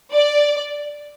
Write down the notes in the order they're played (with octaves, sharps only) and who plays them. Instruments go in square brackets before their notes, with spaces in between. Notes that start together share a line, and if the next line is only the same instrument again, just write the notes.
[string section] D5